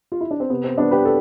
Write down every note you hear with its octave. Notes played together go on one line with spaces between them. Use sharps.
F4
E4
D4
C4
C3 B3
C4
G3 B3 D4
G4 B4
A4